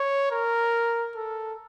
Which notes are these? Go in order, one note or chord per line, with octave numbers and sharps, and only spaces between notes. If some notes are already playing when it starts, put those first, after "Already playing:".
Already playing: C#5
A#4
A4